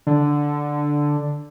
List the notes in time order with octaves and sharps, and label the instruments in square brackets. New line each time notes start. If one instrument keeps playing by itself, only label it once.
[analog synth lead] D3